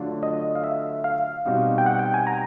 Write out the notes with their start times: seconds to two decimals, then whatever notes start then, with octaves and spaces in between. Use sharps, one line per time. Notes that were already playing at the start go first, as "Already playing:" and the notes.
Already playing: D3 F#3 A3 D4 F4
0.23 D#5
0.55 F5
0.64 E5
1.04 F5
1.45 B2 G3 C4 D#4 F#4
1.78 G5
1.86 F#5
1.99 G5
2.14 G#5
2.27 A#5